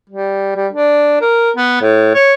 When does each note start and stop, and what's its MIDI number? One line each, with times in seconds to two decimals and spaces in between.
0.10 0.55 55
0.56 0.68 55
0.73 1.17 62
1.21 1.51 70
1.57 1.79 59
1.81 2.13 45
2.15 2.34 73